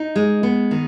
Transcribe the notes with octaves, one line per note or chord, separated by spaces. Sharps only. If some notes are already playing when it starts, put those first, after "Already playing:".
Already playing: D#4
G#3
B3
D#3